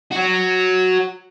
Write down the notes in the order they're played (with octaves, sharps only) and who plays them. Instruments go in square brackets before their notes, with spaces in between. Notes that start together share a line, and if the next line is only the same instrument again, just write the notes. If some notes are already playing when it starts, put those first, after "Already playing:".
[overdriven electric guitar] F#4 C#5